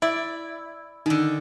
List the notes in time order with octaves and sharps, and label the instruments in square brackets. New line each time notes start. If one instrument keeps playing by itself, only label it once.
[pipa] E4 [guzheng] D5
[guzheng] D3 D#3 [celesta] D#4